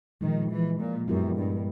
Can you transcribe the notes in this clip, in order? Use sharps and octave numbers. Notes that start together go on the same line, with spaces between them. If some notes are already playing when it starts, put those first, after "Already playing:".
A#2 D#3 F3 G#3
E3
A#2
F#2 G#3 B3 E4 G4 A#4
G2